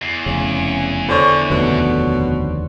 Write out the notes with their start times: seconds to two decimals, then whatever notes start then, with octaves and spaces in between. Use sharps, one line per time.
0.02 E2
0.26 F1 C#3 C#4
1.09 D3 C5 C#5
1.50 F1 D#2 B2 D3